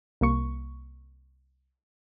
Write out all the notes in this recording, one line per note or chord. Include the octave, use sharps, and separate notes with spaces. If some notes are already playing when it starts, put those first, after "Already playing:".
C2 A#3 C#6